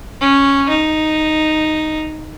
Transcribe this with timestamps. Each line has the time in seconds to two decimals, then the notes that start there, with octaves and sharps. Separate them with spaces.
0.21 C#4
0.69 D#4